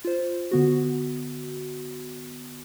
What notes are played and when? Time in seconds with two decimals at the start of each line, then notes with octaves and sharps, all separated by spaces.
0.05 F4 C5
0.51 D3 B3 F#4